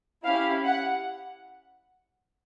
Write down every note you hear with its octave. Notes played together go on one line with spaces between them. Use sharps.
C#4 E4 G4 F5
F#5